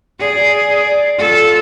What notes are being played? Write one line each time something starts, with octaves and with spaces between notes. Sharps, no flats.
G#4 D5
D5
F4 A4